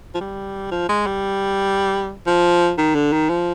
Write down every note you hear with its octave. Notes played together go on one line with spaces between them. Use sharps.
F3
G3
F3
G#3
G3
F3
D#3
D3
D#3
F3